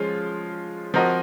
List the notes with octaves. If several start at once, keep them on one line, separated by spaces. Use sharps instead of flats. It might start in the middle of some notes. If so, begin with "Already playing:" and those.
Already playing: F3 G#3 C#4 F4
F3 C4 F#4 A#4 D#5